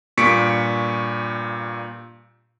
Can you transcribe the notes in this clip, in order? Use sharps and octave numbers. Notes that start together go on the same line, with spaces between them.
G2 A#2 C#6 B6 C#7 D7